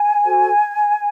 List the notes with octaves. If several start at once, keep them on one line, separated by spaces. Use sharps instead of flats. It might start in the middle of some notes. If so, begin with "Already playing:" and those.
Already playing: G#5
F#4 A4 C5